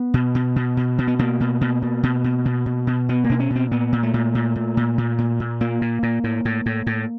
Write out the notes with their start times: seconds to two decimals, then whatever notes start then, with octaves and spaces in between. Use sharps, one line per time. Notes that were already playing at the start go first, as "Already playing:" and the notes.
Already playing: B3
0.14 B2
0.35 B2
0.56 B2
0.77 B2
0.98 B2
1.07 B3
1.19 B2 A#3
1.40 B2
1.61 B2
1.82 B2
2.03 B2
2.24 B2
2.45 B2
2.66 B2
2.87 B2
3.09 B2 B3
3.24 A#3
3.29 B2 D4
3.40 C#4
3.50 B2
3.56 C4
3.71 A#2 B3
3.92 A#2
4.03 A3
4.14 A#2
4.35 A#2
4.56 A#2
4.77 A#2
4.98 A#2
5.18 A#2
5.40 A#2
5.61 A#2 A#3
5.82 A#2
6.03 A#2
6.24 A2
6.45 A2
6.66 A2
6.87 A2